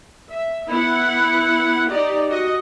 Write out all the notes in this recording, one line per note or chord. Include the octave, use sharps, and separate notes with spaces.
E5
B3 E4 F#5
D#4 G4 D5 D#5
F#4 D#5